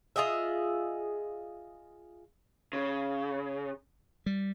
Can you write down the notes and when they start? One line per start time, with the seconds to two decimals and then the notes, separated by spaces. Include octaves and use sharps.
0.16 F4 G#4 D#5 E5
2.73 C#3
4.26 G3